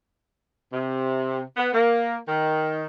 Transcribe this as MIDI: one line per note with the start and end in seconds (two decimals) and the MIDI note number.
0.73 1.42 48
1.57 1.70 59
1.74 2.16 58
2.28 2.85 51